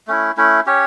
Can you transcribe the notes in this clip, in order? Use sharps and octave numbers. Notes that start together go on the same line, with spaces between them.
A3 C#4 E4
A3 C#4 E4
C#4 G4 C#5